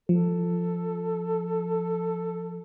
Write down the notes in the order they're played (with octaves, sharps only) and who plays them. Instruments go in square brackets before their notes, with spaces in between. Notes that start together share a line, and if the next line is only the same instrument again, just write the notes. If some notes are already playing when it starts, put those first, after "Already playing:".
[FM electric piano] F3 [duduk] A4